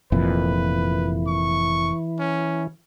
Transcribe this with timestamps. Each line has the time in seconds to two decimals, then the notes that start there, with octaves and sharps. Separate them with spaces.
0.12 F1 F2 A#2 E3 B4
1.27 C#6
2.19 C#4